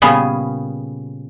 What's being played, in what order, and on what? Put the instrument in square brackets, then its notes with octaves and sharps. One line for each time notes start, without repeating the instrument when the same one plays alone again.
[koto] A#2 C#3 G3 B3 C#4 G#4